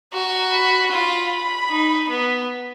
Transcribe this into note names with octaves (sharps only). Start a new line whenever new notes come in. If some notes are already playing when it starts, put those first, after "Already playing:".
F#4 A#5
B5
F4 B5
D#4
B3